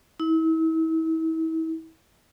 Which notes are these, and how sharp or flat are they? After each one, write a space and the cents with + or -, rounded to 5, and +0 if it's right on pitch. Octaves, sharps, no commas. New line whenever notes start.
E4 -40